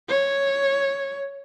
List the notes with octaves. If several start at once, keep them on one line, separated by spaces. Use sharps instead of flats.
C#5